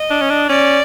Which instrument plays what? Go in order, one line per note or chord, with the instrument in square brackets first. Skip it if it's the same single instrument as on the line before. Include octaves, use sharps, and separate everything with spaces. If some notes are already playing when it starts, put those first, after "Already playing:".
Already playing: [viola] D#5
[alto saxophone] D4
C#4
D4
[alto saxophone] C#4 [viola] D5